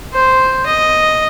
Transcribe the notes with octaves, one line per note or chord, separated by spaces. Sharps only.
C5
D#5